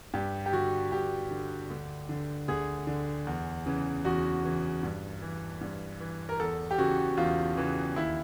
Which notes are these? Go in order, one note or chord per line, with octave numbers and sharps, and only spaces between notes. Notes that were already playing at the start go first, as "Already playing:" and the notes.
G2 G4
G4
D3 F#4
G2 G4
D3
D2
D3
D2 G#4
D3
E2
C#3 E3
E2 F#4
C#3 E3
G2
E3
G2
E3
A#4
E2 A4
G4
C#3 E3 F#4
E2 F4
C#3 E3
D#2 E4